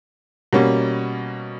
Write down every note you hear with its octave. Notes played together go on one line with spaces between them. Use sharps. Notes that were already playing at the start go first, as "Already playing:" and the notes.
B2 G3 A#3 C#4